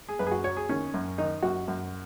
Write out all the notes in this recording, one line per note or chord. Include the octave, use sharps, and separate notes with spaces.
G#4
F#2 B4
G#4
F#4
F#3 C#5
G#4
D#3 C#4
F#2
D#3 D#4
F#2 F#4
F#2